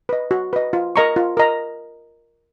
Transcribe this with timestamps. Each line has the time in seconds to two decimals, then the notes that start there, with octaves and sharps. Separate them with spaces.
0.09 B4 D#5
0.31 F#4
0.53 B4 D#5
0.73 F4
0.96 A#4 D#5 A#5 C#6
1.16 F4
1.37 A#4 D#5 A#5